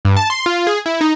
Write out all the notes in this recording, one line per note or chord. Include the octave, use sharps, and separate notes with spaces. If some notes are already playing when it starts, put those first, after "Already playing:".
G2
A5
C6
F4
G#4
E4
D#4